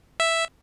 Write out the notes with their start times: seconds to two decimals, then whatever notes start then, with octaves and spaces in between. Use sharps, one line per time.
0.20 E5